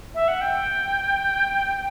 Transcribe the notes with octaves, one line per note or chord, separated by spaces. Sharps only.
E5
F#5
G5